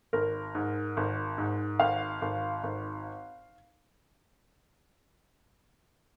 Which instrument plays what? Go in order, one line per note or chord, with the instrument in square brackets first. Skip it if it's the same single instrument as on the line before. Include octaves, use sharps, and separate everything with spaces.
[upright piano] G#1 A#4
G#2
G#1
G#2
G#1 F5
G#1
G#1